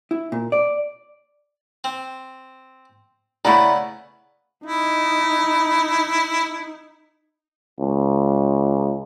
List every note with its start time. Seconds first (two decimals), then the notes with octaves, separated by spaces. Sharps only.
0.11 E4
0.32 A#2
0.52 D5
1.84 C4
3.45 C#3 A3 B3 E4 D5 A#5 B5
4.66 D#4 E4
7.80 C#2